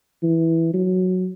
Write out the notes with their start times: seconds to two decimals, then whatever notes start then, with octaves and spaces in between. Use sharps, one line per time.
0.23 E3
0.73 F#3